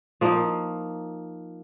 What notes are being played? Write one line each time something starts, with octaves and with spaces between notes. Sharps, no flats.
F3 A#3 D#4